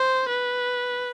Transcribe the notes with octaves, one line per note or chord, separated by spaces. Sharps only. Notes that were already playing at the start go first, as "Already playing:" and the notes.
Already playing: C5
B4